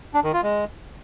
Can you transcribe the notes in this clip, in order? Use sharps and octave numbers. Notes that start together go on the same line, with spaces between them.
D4
D#3
F4
G#3